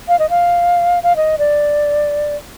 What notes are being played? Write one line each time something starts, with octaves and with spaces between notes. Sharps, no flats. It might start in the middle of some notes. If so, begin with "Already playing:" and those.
F5
D#5
F5
F5
D#5
D5